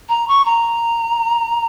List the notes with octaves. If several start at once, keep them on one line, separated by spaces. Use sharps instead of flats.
A#5
C#6
A#5